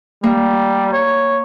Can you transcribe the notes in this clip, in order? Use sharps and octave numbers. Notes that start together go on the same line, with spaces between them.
G3 A#3
C#5